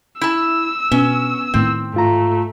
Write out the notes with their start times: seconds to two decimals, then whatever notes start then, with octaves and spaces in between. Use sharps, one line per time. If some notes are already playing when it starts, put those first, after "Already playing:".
0.21 E4 A5 E6
0.92 B2 B3 C#4
1.54 A2 D#3 C4
1.94 G#2 A3 F4 A#5